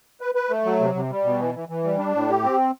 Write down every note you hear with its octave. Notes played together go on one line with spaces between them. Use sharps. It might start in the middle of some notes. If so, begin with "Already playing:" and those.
B4
B4
A3
F#3
C3
C3
G3
B2
E3
E3
E3
G3
D4
A2
G4
C4